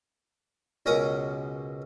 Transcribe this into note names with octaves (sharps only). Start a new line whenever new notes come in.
C#2 B2 C#4 A#4 A#5 D#6